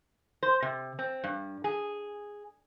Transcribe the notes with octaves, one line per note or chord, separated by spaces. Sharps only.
C5
C3
C4
G2
G#4